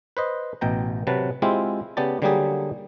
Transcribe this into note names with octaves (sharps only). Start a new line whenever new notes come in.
B4 C5 D#5
A1 B2 G5 A#5
C3 F#3 B4 A5
G#3 C4 E4 F4 G4
C#3 B3 G4 D5 A5
D3 F#3 G3 A#3 G4 G#4